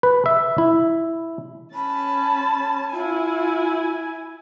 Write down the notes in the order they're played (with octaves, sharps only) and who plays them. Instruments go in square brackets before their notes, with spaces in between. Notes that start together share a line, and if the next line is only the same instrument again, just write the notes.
[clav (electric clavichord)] B4
E5
E4
[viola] C#4 A5 [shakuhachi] B5
[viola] E4 G#5 [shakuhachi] F4